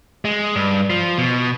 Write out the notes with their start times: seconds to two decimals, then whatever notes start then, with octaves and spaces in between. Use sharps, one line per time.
0.25 G#3
0.56 G2
0.90 F3
1.18 B2